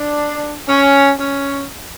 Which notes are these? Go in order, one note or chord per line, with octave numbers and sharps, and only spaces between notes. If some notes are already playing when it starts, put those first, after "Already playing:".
Already playing: D4
C#4
C#4